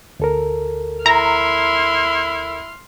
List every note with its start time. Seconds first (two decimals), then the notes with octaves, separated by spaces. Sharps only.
0.20 D2 A4 A#4
1.06 E4 A#5 C6 F6